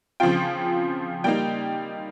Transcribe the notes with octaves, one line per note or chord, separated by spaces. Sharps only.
C#3 F3 C4 F4 G5
G3 A#3 D#4 G5